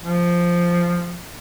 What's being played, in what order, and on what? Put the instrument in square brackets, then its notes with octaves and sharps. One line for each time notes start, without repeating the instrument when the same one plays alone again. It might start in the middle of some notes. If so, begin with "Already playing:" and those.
[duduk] F3